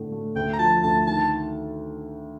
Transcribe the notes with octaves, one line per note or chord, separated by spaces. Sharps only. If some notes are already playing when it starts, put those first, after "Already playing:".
Already playing: A2 D3 A3
A3
D2 G5
A#5
F3 A5
D2 A5
D#3 A5